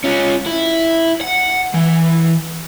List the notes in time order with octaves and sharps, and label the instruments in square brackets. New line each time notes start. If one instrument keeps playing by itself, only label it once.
[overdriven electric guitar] C#4 F4
E4
F#5
E3